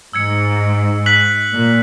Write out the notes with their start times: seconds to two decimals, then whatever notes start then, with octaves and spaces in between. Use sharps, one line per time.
0.13 G#2 E6 G#6 C#7
1.06 F#6 B6 F#7
1.51 A#2